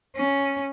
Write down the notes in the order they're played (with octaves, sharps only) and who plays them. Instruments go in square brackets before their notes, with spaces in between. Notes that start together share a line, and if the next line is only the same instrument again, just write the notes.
[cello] C#4